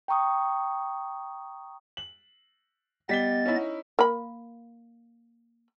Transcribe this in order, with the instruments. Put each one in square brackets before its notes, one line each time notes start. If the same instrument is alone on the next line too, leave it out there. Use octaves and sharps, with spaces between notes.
[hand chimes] G5 A#5 C#6 D#6
[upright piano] F#7
[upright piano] G3 B6 G7 [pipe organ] B3 D#5 A6
[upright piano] C#4 D#4 E4
[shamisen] A#3 B5